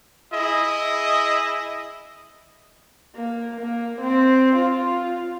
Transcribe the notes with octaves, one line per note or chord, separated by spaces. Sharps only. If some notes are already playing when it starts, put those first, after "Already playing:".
E4 G#4 D#5
A#3
A#3
C4
F4